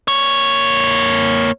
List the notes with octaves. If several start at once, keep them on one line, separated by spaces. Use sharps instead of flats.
A#3 C#5